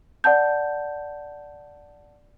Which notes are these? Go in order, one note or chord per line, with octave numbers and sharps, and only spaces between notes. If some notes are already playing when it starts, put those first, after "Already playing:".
D5 F#5 A5 G6